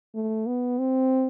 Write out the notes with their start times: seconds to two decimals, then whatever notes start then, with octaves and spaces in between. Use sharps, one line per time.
0.15 A3
0.47 B3
0.79 C4